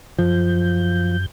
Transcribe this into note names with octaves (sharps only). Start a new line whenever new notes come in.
F#2 F3 G6